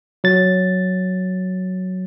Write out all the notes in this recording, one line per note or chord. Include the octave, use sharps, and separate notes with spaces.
F#3 A6